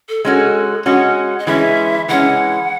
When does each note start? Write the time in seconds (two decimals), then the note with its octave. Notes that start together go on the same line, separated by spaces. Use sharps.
0.09 A4
0.25 G#3 C#4 F#4 A4
0.86 G#3 C#4 F#4 F#5
1.39 D#5
1.47 E3 G#3 C#4 E5
2.08 E3 G#3 C#4 F#5